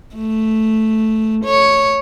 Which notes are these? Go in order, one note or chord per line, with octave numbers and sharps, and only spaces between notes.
A3
C#5